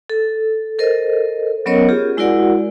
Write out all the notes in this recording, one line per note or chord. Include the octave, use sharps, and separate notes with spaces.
A4
A4 A#4 C5 D#5
F#3 B3 C#4 A#4 C#5 D#5
F4 G4 G#4
G#3 E4 F#4 A#4 D5 F#5